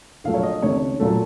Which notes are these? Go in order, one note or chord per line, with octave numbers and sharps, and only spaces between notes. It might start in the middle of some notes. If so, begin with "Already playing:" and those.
A#1 A#2 F#3 A3 F5
C#5
D#5
C#2 C3 D#3 A3 C#5
A#2 F#3 A3